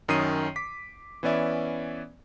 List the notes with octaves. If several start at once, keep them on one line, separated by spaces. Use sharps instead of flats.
F#2 D#3 C#4 D#6 C7 D#7
D6 B6
E3 B3 C#4 D5 E5